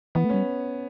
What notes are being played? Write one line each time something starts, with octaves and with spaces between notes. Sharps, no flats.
E3 B3
A3
G3 C#4